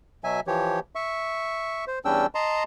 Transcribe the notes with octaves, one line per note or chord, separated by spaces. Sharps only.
B2 F#3 E5 G#5
E3 F3 G4 C#5
E5 C#6
C5
E2 G3 C#4 D4 G5 E6
D#5 A5 A#5 C6